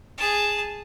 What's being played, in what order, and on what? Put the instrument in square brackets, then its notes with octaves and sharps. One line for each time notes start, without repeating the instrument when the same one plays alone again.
[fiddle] G#4 A5